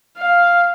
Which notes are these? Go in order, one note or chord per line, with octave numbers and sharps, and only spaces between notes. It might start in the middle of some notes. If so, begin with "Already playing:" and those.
F5